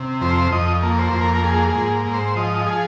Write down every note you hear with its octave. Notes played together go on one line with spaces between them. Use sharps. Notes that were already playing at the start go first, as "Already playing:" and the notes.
Already playing: C3
F2 C5
F2 D#5
A#3
C5
F2
A#4
A#4
A#3 G#4
G#4
G#2
G#2
C5
F3 D#5
G#4